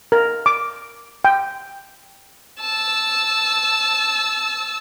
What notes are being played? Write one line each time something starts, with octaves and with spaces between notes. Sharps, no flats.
A#4
D6
G5
A5 E6